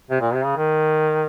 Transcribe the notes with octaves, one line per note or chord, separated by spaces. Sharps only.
C3
A#2
C3
C#3
D#3